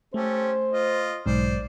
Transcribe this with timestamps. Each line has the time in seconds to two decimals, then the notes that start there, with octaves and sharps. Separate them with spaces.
0.14 A3 C#4 G4 A4 C5
0.72 F4 D#5
1.26 B1 G#2 C5 D5